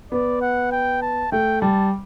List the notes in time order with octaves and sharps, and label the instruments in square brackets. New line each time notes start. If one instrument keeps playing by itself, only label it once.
[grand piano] B3 [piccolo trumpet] D5
[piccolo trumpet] F#5
G5
A5
[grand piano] A3 [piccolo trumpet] G5
[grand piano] G3 [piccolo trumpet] A5